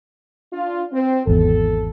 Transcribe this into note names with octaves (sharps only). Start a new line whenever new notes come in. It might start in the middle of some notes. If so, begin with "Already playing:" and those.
D4 F4
C4
G#1 E2 A4